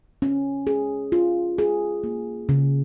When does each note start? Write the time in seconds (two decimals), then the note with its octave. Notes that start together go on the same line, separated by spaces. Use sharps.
0.22 C#4
0.67 G#4
1.12 F4
1.58 G#4
2.04 A#3
2.49 C#3